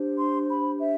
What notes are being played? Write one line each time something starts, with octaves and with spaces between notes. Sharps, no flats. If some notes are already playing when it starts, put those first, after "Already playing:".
Already playing: D4 G4 C5
C6
B5
E5